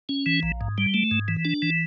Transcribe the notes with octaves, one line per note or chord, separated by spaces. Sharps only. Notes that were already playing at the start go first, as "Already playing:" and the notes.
C#4
E3
A#1
G#2
G3
A3
G#2
E3
D4
E3